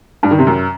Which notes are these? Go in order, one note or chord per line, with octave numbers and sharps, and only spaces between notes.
G2
D#3
C3
F#2